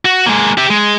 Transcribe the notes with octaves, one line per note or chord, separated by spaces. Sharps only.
F#4
G#3 A#3
G4 E5
G#3